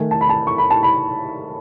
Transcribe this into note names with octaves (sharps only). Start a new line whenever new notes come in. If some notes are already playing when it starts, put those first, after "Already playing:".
Already playing: D#3 A3 G#5
A5
B5
A5
C#6
B5
A5
B5